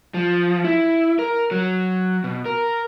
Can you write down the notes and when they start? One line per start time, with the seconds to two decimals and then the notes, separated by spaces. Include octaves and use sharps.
0.14 F3
0.64 E4
1.19 A#4
1.51 F#3
2.24 B2
2.46 A#4